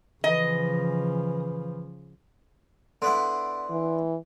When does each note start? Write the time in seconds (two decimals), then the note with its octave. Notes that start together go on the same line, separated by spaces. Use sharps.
0.24 C#3 E3 F3 D#5
3.02 D3 B3 E4 C6
3.70 E3